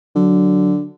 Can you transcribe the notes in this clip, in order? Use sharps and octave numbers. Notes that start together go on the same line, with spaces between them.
D3 F#3